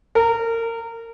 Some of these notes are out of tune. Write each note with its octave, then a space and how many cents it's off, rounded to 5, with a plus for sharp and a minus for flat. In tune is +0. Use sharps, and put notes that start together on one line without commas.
A#4 -25